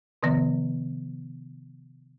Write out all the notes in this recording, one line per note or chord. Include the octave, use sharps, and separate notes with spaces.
C3 D#3 F3 B3